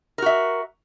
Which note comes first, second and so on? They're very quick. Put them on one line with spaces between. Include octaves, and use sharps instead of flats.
A#4 F#4 E5